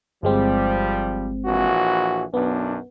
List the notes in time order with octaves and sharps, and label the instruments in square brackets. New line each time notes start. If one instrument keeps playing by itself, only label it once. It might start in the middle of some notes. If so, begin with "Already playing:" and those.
[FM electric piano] G1 G#3 C4 [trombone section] F3 G3
[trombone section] A#1 E3 F#4
[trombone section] B1 F#2 D4 [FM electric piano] B3